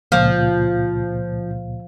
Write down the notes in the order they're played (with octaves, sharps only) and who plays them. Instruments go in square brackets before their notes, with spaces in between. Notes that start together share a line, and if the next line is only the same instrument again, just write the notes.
[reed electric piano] C#2 A#2 [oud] F3